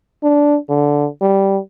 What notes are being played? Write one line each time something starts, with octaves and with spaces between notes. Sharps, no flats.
D4
D3
G3